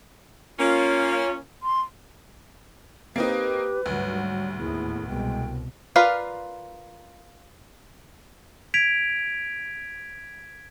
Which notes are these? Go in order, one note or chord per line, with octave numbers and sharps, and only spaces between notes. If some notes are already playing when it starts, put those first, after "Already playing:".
A#3 C#4 F4
C6
A#3 C4 D#4 G4 B4
D2 G#2 F#3 G3
D#2 A2 B3 E4 G#4
C2 B2 G#3 G5
F4 A#4 B4 D5 F5
G#6 B6 D7 F7